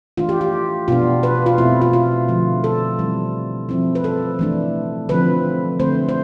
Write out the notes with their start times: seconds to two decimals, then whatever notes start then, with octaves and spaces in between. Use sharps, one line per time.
0.17 E3 A3 D4 F4
0.29 G4
0.41 G4
0.88 B2 B3 D4 F4
1.23 B4
1.46 F4
1.58 B2 A3 C4 E4
1.81 F4
1.93 F4
2.28 D3 F3 A3
2.64 A4
2.99 E3 G3 C4 E4
3.69 F3 C4 E4
3.95 B4
4.04 A4
4.39 E3 A3 D4
5.09 D3 F3 C4 B4
5.80 D3 A3 C4 C5
6.09 C5